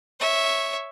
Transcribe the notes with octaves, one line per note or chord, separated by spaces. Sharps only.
C#5 E5